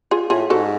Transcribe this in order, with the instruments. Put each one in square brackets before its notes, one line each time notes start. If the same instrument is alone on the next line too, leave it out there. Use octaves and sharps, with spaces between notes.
[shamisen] F4 G#4
[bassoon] A2 [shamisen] F4 G#4
[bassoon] G#2 [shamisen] F#4 A4